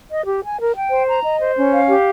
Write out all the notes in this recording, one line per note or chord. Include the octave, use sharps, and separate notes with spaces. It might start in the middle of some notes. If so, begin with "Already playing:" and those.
D#5
G4
G#5
A#4
G5
C5
A#5
D#5
C5
C#4
F5
G4